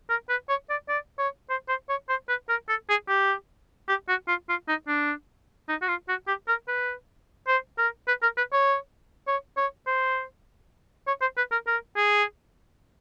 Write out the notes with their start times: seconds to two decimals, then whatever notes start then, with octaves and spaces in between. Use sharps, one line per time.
0.10 A#4
0.29 B4
0.49 C#5
0.70 D5
0.89 D5
1.19 C#5
1.50 C5
1.68 C5
1.89 C#5
2.09 C5
2.28 B4
2.49 A#4
2.69 A4
2.89 G#4
3.08 G4
3.88 G4
4.08 F#4
4.28 F4
4.49 F4
4.68 D#4
4.88 D4
5.69 D#4
5.81 F#4
5.88 F4
6.09 F#4
6.27 G4
6.48 A#4
6.68 B4
7.48 C5
7.78 A#4
8.08 B4
8.22 A#4
8.37 B4
8.53 C#5
9.27 C#5
9.57 C#5
9.87 C5
11.07 C#5
11.21 C5
11.37 B4
11.52 A#4
11.67 A#4
11.96 G#4